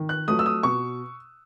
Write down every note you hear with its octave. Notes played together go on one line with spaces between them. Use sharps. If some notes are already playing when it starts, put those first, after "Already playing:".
Already playing: D#3
F#6
F#3 A3 D#6
E6
D#6
B2 C#6